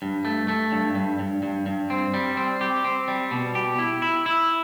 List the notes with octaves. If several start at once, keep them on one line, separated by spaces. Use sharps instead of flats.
G2
A3
A3
G2
G2
G2
G2
G2
C4
G3
C4
G4
C4
G3
B2
G4
E4
E4
E4